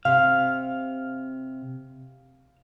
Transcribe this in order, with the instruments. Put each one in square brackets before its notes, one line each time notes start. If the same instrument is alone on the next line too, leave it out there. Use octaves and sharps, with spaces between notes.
[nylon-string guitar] C3 [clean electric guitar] F5